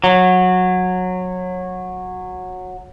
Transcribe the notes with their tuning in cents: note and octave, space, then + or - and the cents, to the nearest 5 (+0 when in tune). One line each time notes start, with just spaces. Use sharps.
F#3 -15